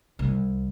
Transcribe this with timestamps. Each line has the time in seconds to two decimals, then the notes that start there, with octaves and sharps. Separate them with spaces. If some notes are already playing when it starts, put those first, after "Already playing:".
0.19 C2